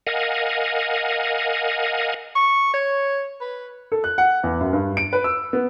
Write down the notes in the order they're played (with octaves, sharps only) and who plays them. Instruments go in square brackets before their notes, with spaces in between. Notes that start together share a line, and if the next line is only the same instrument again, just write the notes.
[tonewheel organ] A#4 D#5 F5 F#5 G#5
[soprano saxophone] C#6
C#5
B4
[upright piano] A4
F#6
F#5
E2
F#2
G2
D7
B4
E6
B3